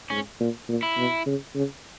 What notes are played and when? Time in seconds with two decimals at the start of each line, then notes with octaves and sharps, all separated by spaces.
0.10 G#2 C#4
0.40 A#2
0.68 A#2
0.83 E4
0.97 B2
1.26 C#3
1.55 C#3